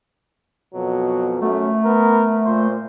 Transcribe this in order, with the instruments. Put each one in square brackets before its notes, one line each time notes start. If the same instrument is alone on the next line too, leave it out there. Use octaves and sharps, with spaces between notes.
[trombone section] F2 B2 F#3
[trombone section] F#2 [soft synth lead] A3
[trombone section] B3 A#4
A#2 C5